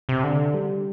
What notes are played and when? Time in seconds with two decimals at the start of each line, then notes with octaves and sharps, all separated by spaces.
0.09 C3
0.24 D3
0.54 G3